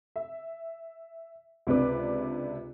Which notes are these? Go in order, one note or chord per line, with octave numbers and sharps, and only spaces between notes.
E5
C#2 C3 D4 B4 D6